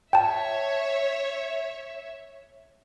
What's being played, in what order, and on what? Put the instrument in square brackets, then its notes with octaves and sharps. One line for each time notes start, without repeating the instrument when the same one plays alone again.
[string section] C#5 E5 [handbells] G5 A5